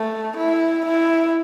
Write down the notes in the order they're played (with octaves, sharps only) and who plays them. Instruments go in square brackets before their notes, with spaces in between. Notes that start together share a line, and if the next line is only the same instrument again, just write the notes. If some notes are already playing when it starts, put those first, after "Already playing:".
Already playing: [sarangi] A3
E4
E4